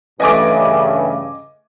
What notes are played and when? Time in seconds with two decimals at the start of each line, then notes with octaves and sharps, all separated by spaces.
0.20 G2 C#3 E3 A3 D#5 G#5 D6